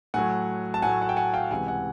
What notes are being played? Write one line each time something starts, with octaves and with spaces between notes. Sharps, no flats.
A2 F#3 A3 F#5 G#5
A5
A2 F#3 A3 F#5 G#5
F#5
G5
F#5 G#5
F5 G5
C#2 C3 E3 G#3 F#5 G#5
F#5 G#5